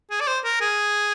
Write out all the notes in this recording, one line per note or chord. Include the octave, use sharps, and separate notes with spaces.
G#4
D5
C5
A#4
G#4